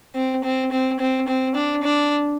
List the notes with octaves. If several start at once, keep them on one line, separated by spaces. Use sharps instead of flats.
C4
C4
C4
C4
C4
D4
D4